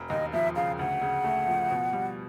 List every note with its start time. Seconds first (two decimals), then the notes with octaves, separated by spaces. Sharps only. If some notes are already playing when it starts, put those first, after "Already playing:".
Already playing: E1
0.10 D#2 D#5
0.33 F3 E5
0.56 C#3 F5
0.79 D2 F#5
1.01 C#3
1.24 A3
1.47 F3
1.71 B2
1.93 G3